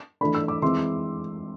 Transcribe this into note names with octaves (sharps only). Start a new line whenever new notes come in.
E3 A3 D4 B5
E6
D6
E3 G#3 C4 C6